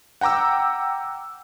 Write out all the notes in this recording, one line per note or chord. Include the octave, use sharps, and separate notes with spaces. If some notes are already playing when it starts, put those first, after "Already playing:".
F#5 G5 A#5 D6 E6